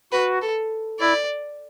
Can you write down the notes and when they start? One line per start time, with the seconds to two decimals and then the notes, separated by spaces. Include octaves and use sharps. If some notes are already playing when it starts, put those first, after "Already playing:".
0.12 F#4 B4
0.42 A4
1.00 E4 D5